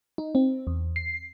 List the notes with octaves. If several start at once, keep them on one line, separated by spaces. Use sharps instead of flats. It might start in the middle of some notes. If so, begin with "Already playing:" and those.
D#4
C4
E2
C7